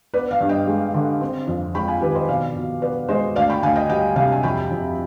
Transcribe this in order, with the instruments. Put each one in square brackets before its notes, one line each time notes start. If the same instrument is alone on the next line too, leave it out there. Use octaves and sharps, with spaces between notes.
[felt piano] B3 B4 D5
D5 F5
G2
D#5 G5
G#3
D3
C4
F2
G#3 G5 B5
F5 G#5
D#3 G4 B4
C5 D#5
B2 D5 F5
B2
B3 B4 D5
G#3 C5 D#5
D2 D5 F5
G5 B5
D2 F5 G#5
D#5 G5
G3 D#5 G5
C3 F5 G#5
G#5
F2 G5 B5
F2